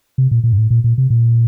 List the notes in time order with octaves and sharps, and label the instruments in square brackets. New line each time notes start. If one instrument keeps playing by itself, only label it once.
[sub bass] C3
A#2
A#2
G2
A2
A#2
A#2
C3
A#2